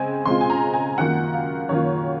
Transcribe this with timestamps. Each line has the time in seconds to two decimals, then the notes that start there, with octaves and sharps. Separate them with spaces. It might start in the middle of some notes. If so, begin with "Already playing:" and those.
Already playing: C#3 G#3 C4 G#5
0.25 C#3 G#3 C4 F4 C6
0.41 G#5
0.50 A#5
0.74 G#5
0.98 F#2 D#3 A#3 F4 F#5
1.34 F5
1.69 F#2 D#3 A#3 F4 C#5